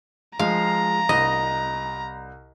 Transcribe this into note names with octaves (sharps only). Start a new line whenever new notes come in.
F3 G#3 F5 A#5
C2 D#5